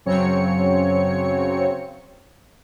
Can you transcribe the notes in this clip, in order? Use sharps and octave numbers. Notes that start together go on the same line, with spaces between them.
F#2 C#3 F#3 C4 C#5 C#7